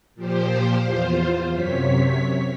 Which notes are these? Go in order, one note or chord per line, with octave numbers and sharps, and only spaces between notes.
A#2 F3 G4 C5
E2 F4 C5
F#2 C3 C#5 B6